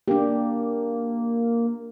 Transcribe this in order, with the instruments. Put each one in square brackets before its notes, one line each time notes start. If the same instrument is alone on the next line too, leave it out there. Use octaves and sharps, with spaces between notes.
[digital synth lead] A#3 [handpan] D4 G4